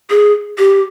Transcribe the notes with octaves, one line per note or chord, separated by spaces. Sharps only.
G#4
G4